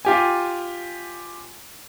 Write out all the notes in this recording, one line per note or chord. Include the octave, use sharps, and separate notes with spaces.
F4 G4 G#5